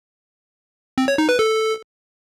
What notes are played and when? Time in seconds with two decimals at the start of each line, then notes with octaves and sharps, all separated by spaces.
0.98 C4
1.08 C#5
1.18 D#4
1.29 B4
1.39 A4